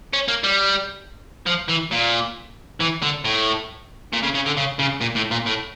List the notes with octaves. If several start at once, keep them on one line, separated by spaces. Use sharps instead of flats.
C#4
A#3
G3
F3
E3
A#2
E3
D3
A2
A#2
C#3
C#3
D3
C#3
C#3
A#2
A2
A#2
A2